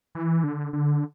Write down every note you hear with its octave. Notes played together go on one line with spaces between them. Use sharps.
E3
D3
D3